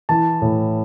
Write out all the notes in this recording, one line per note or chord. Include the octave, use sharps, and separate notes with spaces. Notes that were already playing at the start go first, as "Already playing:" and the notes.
E3 A5
A2